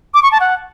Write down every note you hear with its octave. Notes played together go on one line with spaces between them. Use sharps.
D6
C#6
A5
F#5